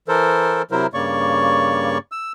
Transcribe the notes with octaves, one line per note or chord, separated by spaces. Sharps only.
E3 A4 A#4 C5
C3 F#3 E4 A#4 C5
G2 C#3 A#3 C#5 D5 C#6
E6